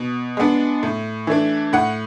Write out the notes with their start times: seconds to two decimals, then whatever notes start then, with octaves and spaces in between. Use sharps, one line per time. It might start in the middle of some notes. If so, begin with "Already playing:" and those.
Already playing: B2
0.37 G#3 B3 D4
0.83 A2
1.27 E3 A3 D4
1.73 A2 F#5